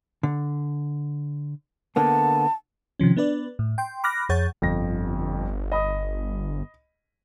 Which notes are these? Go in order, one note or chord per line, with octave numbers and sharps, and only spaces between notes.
D3
D3 A#3 B3 A5
C3 D#3 F3 C#4
B3 D4 B4 D5
A2
G5 C6
B5 D6 F6 F#6 A#6
F2 G#4 C#5 F#5 G6 A6
G1 F2 A#6
D#5 B5 D#6